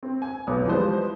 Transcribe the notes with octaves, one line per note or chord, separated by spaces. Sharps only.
C4
G#5
F1 B1 B3 D#6
E3 F3 G3 G#3 B4 C5